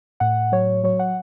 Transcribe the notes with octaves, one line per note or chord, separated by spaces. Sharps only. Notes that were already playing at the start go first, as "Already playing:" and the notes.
A2 F#5
F#3 C#5
F#3 C#5
F#5